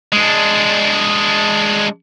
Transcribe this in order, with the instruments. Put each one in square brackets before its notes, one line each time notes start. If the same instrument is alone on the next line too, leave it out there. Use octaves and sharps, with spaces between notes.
[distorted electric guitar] G#3 D4